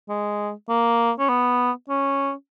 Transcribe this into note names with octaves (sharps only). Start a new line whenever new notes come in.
G#3
A#3
C#4
B3
C#4